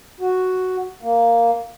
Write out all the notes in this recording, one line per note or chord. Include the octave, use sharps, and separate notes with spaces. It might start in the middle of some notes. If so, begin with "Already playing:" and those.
F#4
A#3